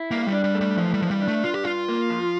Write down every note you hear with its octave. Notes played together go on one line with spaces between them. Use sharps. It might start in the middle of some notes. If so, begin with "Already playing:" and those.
Already playing: E4
G2 A#3
G3
D4
G3
A3
G3
E3 F3
G3
G2 F3
G3
D4
A3
G2 F4
G4
G2 F4
A#3
F3